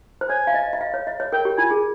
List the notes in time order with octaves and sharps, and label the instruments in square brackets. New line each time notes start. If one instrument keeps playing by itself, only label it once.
[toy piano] C5
[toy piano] C#5 [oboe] G#5
[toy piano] F5
D#5
D#5
F5
C#5
D#5
C#5
[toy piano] A#4 [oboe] G5
[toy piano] G4
[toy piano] F4 [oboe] G#5
[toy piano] G#4